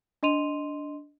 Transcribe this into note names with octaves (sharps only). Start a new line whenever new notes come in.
D4 D#5 C6 D#7 F7